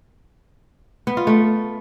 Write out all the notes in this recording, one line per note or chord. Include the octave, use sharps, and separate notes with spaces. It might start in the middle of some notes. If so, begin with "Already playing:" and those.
B3
F4
A3